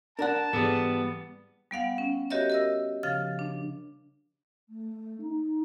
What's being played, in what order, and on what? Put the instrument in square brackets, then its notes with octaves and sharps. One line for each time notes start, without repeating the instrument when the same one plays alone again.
[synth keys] D4 [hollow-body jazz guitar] A#4 D5 F#5 [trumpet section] A5
[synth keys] G#2 E3 A6 [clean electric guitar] G3 B3 [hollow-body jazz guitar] G#4 A4
[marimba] G3 B3 F5 F#5
C#4
F#4 G4 A#4 C#5 D#5 E5
A#4 D#5 E6
C#3 F3 F5 A6
D4
[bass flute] A3
D#4